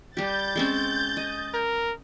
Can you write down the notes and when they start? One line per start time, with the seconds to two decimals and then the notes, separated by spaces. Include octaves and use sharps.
0.17 G3 G4 G6 A6
0.56 G#3 C4 C#4
1.17 D#5
1.54 A#4